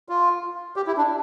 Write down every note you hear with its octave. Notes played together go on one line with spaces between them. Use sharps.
F4
G4
E4
D4